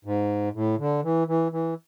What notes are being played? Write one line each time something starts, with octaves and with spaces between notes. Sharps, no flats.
G#2
A2
D3
E3
E3
E3